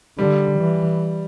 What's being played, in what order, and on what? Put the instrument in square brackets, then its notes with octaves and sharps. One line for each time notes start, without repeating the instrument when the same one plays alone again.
[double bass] D3 [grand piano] G3
[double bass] E3